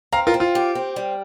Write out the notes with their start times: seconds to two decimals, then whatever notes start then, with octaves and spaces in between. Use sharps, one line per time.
0.12 C4 F5 A#5
0.27 F4 A#4
0.34 C4
0.40 F4
0.55 G4
0.75 C4
0.96 G3